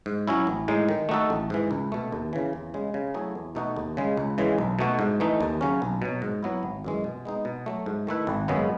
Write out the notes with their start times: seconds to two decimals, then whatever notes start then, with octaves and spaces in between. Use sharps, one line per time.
0.06 G#2
0.28 F#3 C#4 E4
0.47 A1
0.68 A2 G#3 D#4
0.89 D#3
1.09 A3 D#4 F#4 A4
1.30 A1
1.50 G#2 E3
1.71 C#2
1.92 B2 A3
2.12 D#2
2.33 C#3 E3
2.53 E2
2.74 C#3 G#3
2.94 C#3
3.14 F#3 A3 E4 G#4
3.35 E2
3.55 B2 A3 D#4 F#4
3.76 D#2
3.97 C#3 G#3
4.17 C#2
4.38 C#3 E3 G#3
4.58 B1
4.79 B2 A3 D#4 F#4
4.99 G#2
5.20 E3 A3 D#4
5.41 D#2
5.61 C#3 F#3 C#4
5.82 B1
6.02 B2 F#3
6.22 G#2
6.43 F#3 B3 E4
6.63 G#1
6.84 F#2 E3 G#3
7.04 B2
7.25 G#3 B3 D#4
7.45 B2
7.66 F#3 A3
7.86 G#2
8.07 D#3 A3 E4 B4
8.27 G#1
8.48 F#2 C#3 G#3 B3